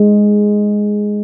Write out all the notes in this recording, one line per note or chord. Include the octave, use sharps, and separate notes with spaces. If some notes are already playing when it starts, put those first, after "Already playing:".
Already playing: G#3